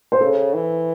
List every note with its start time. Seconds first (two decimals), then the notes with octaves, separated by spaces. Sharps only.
0.12 C5
0.21 C#3 A4
0.54 E3